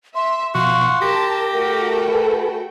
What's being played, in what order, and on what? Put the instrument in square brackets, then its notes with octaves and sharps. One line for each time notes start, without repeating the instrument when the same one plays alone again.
[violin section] E5 [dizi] C6
[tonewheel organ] B2 F3 C#6 [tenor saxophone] F#4 [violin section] F5 [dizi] C6
[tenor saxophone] G4 [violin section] A#4 A5 [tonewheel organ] A#6
[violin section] A3 F#4 G5 [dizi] A#4
[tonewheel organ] G#4 A4 B4